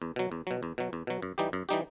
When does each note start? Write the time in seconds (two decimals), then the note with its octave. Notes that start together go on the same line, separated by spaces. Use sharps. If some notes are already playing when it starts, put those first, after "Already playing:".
0.02 E2
0.16 B2 F#3
0.32 E2
0.47 B2 F#3
0.63 E2
0.78 B2 F#3
0.93 E2
1.07 B2 F#3
1.22 F#2
1.38 E3 G3 D#4 G4
1.53 F#2
1.69 E3 G3 D#4 G4